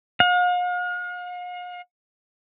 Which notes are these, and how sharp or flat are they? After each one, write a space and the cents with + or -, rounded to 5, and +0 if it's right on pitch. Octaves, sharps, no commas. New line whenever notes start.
F5 +45